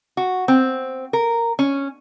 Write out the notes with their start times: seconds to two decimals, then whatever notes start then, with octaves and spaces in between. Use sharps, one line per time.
0.17 F#4
0.48 C4
1.13 A#4
1.59 C#4